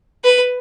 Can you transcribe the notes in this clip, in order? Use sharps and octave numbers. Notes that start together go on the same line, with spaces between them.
B4